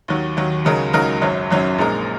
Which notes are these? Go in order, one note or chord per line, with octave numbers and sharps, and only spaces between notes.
D#2 D#3 F#3
D#2 D#3 F#3
C#2 C#3 F#3 D#4 A#4
C#2 C#3 F#3 D#4 A#4
G#1 F#2 F#3 C#4
G#1 F#2 F#3 C#4
A#1 A#2 G#3 D#4 A#4